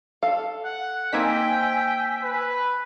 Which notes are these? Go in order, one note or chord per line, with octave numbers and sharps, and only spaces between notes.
A4 F5
F#5
A#3 C4 D#4 G5 G#5 E6 B6
B4